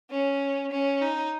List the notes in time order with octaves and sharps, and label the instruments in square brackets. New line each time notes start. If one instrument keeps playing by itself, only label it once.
[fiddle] C#4
C#4
D#4